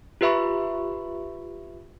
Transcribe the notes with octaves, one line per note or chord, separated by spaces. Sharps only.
F4 G4 B4 E5 B5 C#6